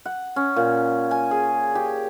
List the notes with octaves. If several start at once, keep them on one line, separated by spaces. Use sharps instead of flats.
F#5
C#4
A#2
G#5
G#4
G4